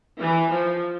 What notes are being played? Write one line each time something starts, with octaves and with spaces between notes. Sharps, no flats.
E3
F3